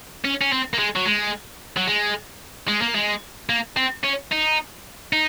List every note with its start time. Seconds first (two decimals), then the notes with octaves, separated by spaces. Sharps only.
0.25 C#4
0.41 C#4
0.52 C4
0.74 A#3
0.79 G#3
0.96 F#3
1.06 G#3
1.77 F#3
1.88 G#3
2.68 G#3
2.82 A#3
2.95 G#3
3.49 A#3
3.77 C4
4.04 C#4
4.31 D#4
5.13 D#4